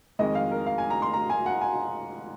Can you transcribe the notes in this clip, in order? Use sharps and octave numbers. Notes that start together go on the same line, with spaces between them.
F2 D#3 G#3 D#5
F5
A#4
F5
G#5
A#5
C6
A#5
G#5
F#5
G#5